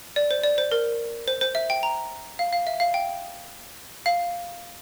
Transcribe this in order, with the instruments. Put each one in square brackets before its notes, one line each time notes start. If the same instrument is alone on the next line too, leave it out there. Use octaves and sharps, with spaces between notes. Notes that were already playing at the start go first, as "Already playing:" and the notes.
[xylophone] D5
C5
D5
C5
A#4
C5
C5
E5
G5
A#5
F5
F5
E5
F5
G5
F5